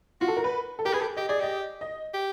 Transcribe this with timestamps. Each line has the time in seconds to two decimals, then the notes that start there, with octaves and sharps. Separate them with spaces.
0.21 F4 F#4
0.28 A4
0.37 A#4
0.44 B4
0.79 A4
0.85 G4 A#4
0.93 G#4 B4
1.01 G4 A4
1.17 G4 D#5
1.28 G#4 D5
1.40 G4 D#5
1.81 D#5
2.13 G4